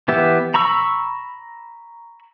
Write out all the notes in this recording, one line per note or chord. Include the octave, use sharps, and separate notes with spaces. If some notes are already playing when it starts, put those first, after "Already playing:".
E3 B3 G4 E5
A#5 B5 C#6 E6